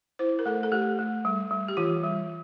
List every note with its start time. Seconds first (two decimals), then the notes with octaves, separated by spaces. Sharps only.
0.19 E4 C5
0.39 A#4
0.46 A3 A4
0.63 A4
0.72 A3 G4
0.99 A3
1.25 G3
1.51 G3
1.68 G4
1.77 E3 F4
2.04 G3